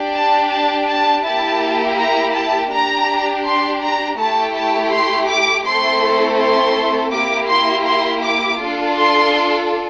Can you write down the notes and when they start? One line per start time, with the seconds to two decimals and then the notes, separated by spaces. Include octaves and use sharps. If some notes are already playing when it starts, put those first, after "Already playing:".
Already playing: D4 G4
0.15 A5
0.52 A5
0.88 A5
1.25 A#3 E4 G4 A5
1.99 A#5
2.35 A5
2.72 D4 G4 A#5
3.45 C6
3.82 A#5
4.19 A3 E4 G4 A5
4.56 A5
4.92 C6
5.30 D6
5.66 A3 C4 E4 A4 C6
6.39 C6
7.12 A#3 E4 G4 D6
7.49 C6
7.86 C6
8.23 D6
8.60 D4 F4 A4
8.97 C6